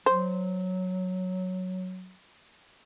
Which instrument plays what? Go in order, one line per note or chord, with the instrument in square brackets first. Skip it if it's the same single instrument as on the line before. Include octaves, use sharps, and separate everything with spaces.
[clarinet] F#3 [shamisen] C5